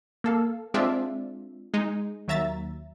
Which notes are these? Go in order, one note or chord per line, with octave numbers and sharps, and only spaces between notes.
A#3 A4 F5
G#3 C4 D4 F4 D5 E5
G#3 D#4
D#2 F#3 E5 A#5 A6